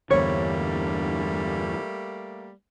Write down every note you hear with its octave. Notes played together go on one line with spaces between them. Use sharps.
E2 G2 D3 G3 A3 A#3 C#5